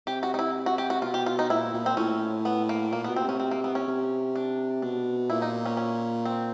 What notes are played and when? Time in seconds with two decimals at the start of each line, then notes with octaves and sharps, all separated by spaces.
0.07 C3 G4
0.23 F#4
0.34 D#4
0.39 E4
0.66 F#4
0.78 G4
0.90 F#4
1.02 B2 F4
1.14 G4
1.26 F4
1.39 D#4
1.50 A#2 E4
1.74 A#2
1.86 C4
1.97 A2 C#4
2.45 B3
2.69 A#3
2.92 A#2 A#3
3.04 B3
3.08 B2
3.16 C4
3.24 C3 C#4
3.40 C4
3.51 A#3
3.64 B3
3.75 C#4
3.87 C3
4.36 D4
4.82 B2 D4
5.30 A#2 E4
5.42 D#4
5.66 C#4
5.77 C#4
6.25 C4